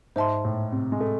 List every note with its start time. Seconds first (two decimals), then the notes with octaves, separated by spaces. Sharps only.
0.16 G#2 C5 E5 A5 C6
0.45 A2
0.72 C3
0.92 G#3
1.00 A3